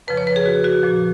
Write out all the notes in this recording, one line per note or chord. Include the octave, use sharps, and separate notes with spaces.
F2 C#3 F3 B4
C#5
B4
G#4
F#4
F#4
A#2 F3